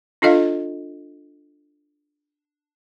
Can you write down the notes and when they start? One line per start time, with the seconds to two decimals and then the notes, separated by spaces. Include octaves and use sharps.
0.22 D4 F4 A4 D#5 F5